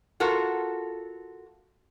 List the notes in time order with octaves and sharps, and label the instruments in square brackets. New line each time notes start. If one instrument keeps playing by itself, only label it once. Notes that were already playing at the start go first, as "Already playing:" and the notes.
[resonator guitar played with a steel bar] F4 F#4 A4 A#4